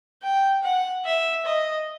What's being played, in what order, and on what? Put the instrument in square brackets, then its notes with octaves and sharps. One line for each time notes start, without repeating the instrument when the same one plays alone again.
[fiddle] G5
F#5
E5
D#5